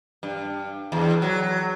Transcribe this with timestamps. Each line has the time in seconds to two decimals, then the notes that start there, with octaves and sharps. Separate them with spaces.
0.23 G2
0.92 E2
1.22 F#3